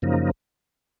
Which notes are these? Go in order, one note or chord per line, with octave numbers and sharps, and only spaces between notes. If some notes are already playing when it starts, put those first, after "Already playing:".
F#2 C#3 F3 A#3 D#4